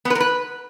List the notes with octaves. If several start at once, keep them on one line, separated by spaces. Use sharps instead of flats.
B3
B4
A#4
B4